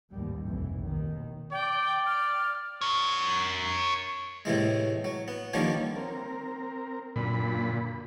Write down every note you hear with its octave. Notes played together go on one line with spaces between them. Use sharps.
A1 D#2 G#2 G3
F1 B1 F2 E3
D#2 B2 D#3
D5 G5
F6
A#4 C#5
A2 C3 E3 G#3
F#3
B3
D3 D#3 F3 G3 A#3 C#4
C4 A#4
F#2 A#2 D3 B5